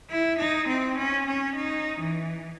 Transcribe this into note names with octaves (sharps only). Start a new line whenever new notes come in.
E4
D#4
C4
C#4
C#4
D#4
E3